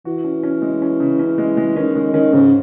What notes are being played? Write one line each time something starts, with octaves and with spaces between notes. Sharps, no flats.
E3 F#4
C#4
C#4
G#3
C#4
C#3
C#4
G#3
G#3
D#3 C#4
D#3 G#3
D#3 C#4
G#2 C#3